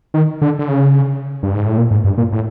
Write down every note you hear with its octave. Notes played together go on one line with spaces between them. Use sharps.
D#3
D3
D3
C#3
G2
G#2
A2
A#2
G#2
G2
A#2
A2